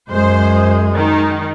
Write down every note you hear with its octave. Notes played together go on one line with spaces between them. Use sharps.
F#2 G#3 C5
D#3 D#4